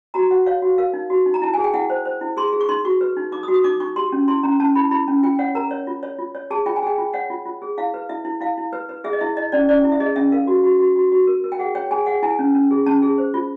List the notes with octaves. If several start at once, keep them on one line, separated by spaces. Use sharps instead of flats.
F#4 A#5
F#4 F#5
C#5 F5
F#4
A#4 F5
D#4
F#4
D#4
A#5
E4 A5
G#4 G#5
G5
E4 F#5
C5
C5
E4
G#4 C6
G#4
C#6
D#4 C6
F#4 C#6
B4
D#4
D#4 D6
D#6
F#4
D#6
D#4 D6
D#4 C#6
G4 C6
C#4
E4 C6
C#4 A#5
C#4 A5
E4 B5
E4 B5
C#4
F4 G5
C#5 F#5
A#4 A#5
C#5
F4
C#5
F4
C#5
G#4 A5
F4 G5
G#5
G#4 G5
F4
C#5 F#5
F4
F4
G#4
E4 F5
B4
E4 E5
E4
E4 F5
E4
B4
B4
G#4 E5
D#5
E4 E5
E4 D#5
C#4 D5
C#4 D5
E4
E5
G#4 D#5
C#4 E5
A#4 F5
F#4
F#4
F#4
F#4
F#4
A#4
A#4
G5
G#4 F#5
C#5 G5
G#4 G#5
G#4 F#5
E4 G#5
C#4
C#4
G#4
C#4 A5
G#4
C5
F4